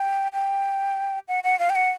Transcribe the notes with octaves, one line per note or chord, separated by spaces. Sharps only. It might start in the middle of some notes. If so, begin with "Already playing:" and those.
Already playing: G5
G5
F#5
F#5
F5
G5
F#5